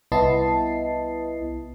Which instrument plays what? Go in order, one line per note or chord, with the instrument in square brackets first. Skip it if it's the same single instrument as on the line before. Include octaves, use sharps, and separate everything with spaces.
[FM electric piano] C2 B3 E4 D#5 A5 C7